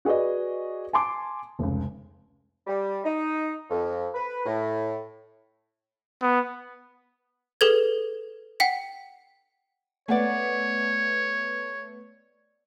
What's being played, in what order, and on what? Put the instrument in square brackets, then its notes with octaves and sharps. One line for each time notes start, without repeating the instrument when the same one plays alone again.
[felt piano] F#4 G#4 B4 D5 D#5
G#5 A5 C6 D6
F1 C#2
[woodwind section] G3
D#4
F2
B4
A2
[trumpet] B3
[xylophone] G#4 A4 B4 G#6
F#5 G5 B6
[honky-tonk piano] A3 B3 [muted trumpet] C#5 [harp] D5 F#5 G#5